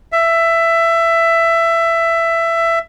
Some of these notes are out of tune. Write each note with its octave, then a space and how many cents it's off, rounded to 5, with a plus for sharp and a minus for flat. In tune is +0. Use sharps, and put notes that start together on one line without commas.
E5 +15